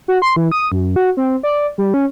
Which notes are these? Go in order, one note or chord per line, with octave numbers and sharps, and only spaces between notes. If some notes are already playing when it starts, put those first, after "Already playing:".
F#4
C6
E3
D#6
F#2
F#4
C4
D5
G3
C#4